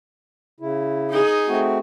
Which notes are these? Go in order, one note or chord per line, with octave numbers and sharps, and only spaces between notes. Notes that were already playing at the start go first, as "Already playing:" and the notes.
C#3 E4
D#4 G#4
A3 C4 F#4